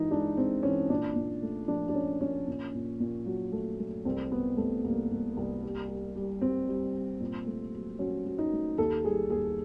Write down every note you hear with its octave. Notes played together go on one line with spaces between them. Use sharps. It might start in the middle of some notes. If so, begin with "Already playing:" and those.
Already playing: E3 G#3 D#4 F4
G#3 D4
G#3 C4
E3 C#4
A#2 D4
A#2
A3
F3 D4
D4
F3 C#4
F3 C#4
A#2
A#2
A#2
F#3
A3
A3
C2 C4
C2 B3
C2 A3
C2 A#3
C2
C2
G3
G3
G3
G3 C4
G3
G3
A#2
A3
F#3
F#3 C#4
F#3
D#4
A3
D#2 A4
G3 G#4
D#2 G#4